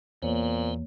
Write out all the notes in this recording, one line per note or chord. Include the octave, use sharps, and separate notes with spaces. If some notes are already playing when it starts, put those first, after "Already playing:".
E2 A#2 A#3 B3 C5 C#5